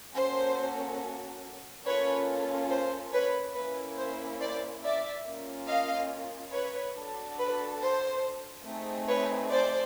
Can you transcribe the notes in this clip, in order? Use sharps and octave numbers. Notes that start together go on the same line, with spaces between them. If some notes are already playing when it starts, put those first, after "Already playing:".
A#3 C#4 F#4 A4 C5
A#3 C#4 F4 A4 B4 C#5
C5
B4 C#5
A#3 C#4 E4 B4
C5
C5 D5
D5 E5
A#3 C#4 F4
D#5 F5
B4 C#5
D4 F#4 A4
B4
C5
A3 C4 D#4 G#4
B4 C#5
C5 D5